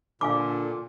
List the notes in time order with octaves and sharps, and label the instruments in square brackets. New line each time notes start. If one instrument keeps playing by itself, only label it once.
[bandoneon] A#2 [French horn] D3 [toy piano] F5 G#5 D6